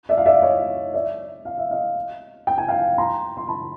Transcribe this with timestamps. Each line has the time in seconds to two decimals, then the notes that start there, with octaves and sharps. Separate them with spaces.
0.09 D5 E5
0.17 F5
0.26 D5 E5
0.42 C#5 D#5
0.94 D5 E5
1.45 F5
1.58 E5
1.71 D#5 F5
2.47 G5
2.58 G#5
2.68 F5 G5
2.98 A#5 C6
3.37 C6
3.48 A5 B5